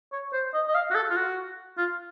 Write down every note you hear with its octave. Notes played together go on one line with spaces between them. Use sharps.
C#5
C5
D#5
D#5
F5
F#4
A4
F4
F#4
F4